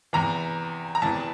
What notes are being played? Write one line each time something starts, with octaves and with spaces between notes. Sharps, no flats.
E2 C3 E3 A#5
A#5
E2 C3 E3 A5